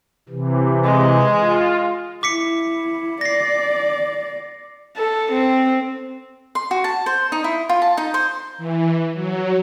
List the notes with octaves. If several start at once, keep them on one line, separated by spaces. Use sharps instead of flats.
C3 E3
G#3
F4
E4 D6 B6 C#7
D5 A#6 C7
A4
C4
C6
F#4
A5
C5
D#4
E4
F4
A5
D#4
C5
E3
F#3